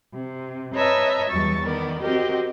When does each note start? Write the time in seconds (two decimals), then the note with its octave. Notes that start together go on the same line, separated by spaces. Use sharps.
0.13 C3
0.74 B4 C#5 D#5 E5 A5 A#5
1.28 E2 F#3 G3 C#6 A6
1.62 D#3 B3 A#4 D5
2.02 C4 F#4 G4 A#4 D#5